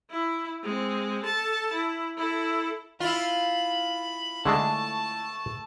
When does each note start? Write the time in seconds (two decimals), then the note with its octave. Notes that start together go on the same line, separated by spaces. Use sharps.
0.10 E4
0.63 G#3 C4
1.24 A4 A5
1.73 E4
2.17 E4 A4
3.00 E4 F4 B5
4.45 D3 G#3 A3 D4 A5